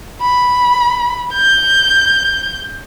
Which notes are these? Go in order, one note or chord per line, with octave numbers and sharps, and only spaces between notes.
B5
G6